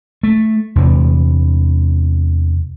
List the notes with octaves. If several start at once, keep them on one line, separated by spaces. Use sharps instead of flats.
A3
E2 C3 E3